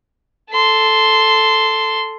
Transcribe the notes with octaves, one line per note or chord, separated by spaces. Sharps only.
A4 C6